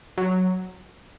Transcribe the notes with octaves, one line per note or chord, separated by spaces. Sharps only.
F#3